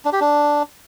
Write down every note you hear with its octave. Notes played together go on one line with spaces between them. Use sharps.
D4
G4
D4